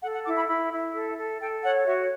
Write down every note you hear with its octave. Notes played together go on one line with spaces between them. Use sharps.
A4 F#5
F#5
E4 D6
B5
E4 B5
E4
A4
A4
A4 G5
C#5 F#5
F#4 E5